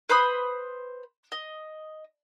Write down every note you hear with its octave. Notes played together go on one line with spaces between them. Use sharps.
B4 C5 B5 D#6
D#5